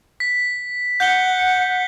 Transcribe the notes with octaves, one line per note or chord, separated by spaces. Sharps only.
B6
F#5 G6 G7